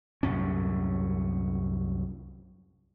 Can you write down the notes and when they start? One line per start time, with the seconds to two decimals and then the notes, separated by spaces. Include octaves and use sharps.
0.23 C2 F#2 A2 C#4